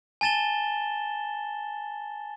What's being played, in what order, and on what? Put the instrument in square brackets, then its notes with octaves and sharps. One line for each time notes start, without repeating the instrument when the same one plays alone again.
[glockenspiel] G#5 A5 A6 E7 G7